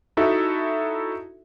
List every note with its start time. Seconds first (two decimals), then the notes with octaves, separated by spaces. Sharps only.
0.17 D#4 E4 F#4 A4 E5